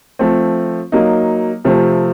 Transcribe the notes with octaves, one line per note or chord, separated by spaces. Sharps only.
F3 A3 C4
F#3 A#3 D#4
C3 F3 A3 C4